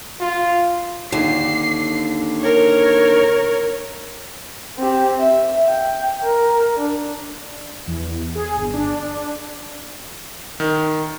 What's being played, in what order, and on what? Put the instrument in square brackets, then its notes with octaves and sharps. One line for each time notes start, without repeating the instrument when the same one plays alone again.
[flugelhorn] F4
[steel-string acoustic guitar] D#2 D3 [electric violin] C7
[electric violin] A#4 C#5
[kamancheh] C4 G4
E5
G5
A#4
D4
[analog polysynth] E2
G#4
G1
D4
[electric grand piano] D#3